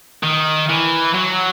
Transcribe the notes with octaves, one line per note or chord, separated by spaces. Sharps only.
D#3
E3
F#3